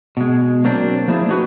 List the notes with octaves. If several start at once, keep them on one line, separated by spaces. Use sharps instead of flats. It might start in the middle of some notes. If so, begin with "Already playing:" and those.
B2 G#3
F#3 A#3 C4 D4
F3 A3 A#3 D4 E4 G#4
D#4 F#4 B4